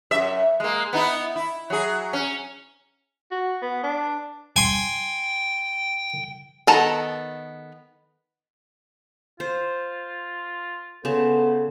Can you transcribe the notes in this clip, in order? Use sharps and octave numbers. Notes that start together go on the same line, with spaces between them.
F#2 E5
G#3 A#3
B3 D#4 E4
E4
F#3 G#4
C#4
F#4
B3
D4
G5 G#5 C6
D#3 B3 A4 A5 A#5
F4 C5
C#3 B3 A4 C5 A5